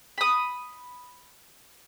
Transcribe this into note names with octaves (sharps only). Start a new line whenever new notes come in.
B5 D#6